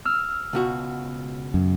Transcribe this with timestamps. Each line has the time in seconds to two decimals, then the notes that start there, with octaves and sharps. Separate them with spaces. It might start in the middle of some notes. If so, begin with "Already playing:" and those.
0.05 E6 F6
0.53 C#2 B2 F#4
1.54 F#2